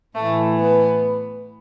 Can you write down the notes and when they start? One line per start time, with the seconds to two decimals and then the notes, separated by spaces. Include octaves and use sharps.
0.16 A2 E3 A3
0.58 B3